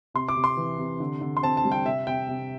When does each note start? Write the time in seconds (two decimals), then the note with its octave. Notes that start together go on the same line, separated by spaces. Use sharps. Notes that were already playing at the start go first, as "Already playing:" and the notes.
0.14 C3 C6
0.29 D6
0.36 C3
0.44 C6
0.57 E3
0.79 C3
1.00 D3
1.21 D3
1.37 C6
1.43 C4 A5
1.57 A5
1.65 G3
1.72 G5
1.85 C3 E5
2.07 C3 G5
2.29 C3